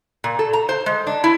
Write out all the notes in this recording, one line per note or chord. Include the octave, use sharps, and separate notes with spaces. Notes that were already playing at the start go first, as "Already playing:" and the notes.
A#2
A4
A#5
C5
G#3
D4
E4